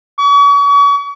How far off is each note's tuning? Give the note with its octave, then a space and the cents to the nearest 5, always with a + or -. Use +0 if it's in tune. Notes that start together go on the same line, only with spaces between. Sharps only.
C#6 +40